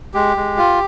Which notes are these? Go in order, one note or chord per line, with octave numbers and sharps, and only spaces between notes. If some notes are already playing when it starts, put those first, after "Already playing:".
G#3 G4
G#3
F4